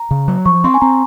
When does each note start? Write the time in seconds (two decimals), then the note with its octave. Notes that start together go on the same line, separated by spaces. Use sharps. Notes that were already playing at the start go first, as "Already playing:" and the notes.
Already playing: A#5
0.11 C#3
0.28 F#3
0.45 F3 C#6
0.64 C4 C6
0.74 G#5
0.81 C4 A#5